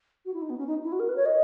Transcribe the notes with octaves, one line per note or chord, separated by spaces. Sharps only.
F#4
E4
D#4
B3
C#4
D#4
E4
F#4
A#4
B4
C#5
D#5